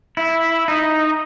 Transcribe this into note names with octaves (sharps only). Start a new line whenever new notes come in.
E4
D#4